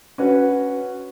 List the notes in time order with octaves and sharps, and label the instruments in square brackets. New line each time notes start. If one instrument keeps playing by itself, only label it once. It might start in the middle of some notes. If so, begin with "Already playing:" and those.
[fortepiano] C#4 F#4 B4